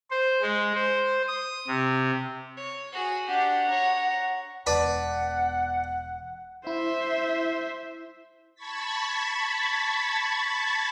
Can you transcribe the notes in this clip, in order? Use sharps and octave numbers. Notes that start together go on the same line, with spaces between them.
C5
G#3
C5
D#6
C3
C#5
F#4 G#4
D4 G4 F#5
C#5 A#5
E1 E2 D4 B4 F#5 B5
E4 C5 E5
A5 B5 C#6 G#6 A6 B6